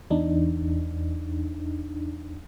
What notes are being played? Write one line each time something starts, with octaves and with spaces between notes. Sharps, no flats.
E2 D4 D#4